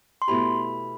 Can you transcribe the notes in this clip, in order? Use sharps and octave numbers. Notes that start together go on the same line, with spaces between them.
C6
B2 A3 E4 G4 B5